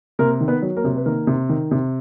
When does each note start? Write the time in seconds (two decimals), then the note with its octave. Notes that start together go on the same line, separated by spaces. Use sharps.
0.19 C3 A#3 A#4
0.40 D#3
0.48 B3 B4
0.62 F#3
0.77 A#3 A#4
0.84 C3
0.96 B4
1.06 D#3 A#3 A#4
1.27 C3
1.49 D#3
1.71 C3